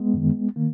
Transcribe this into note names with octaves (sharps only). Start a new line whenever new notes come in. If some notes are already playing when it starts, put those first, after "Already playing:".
Already playing: G#3 B3
F#2 D#3
D#3 A#3